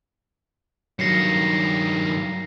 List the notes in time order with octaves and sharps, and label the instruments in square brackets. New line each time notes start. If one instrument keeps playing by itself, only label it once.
[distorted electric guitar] G2 D#3 [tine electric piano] F#3 [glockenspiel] A#6 C7 C#7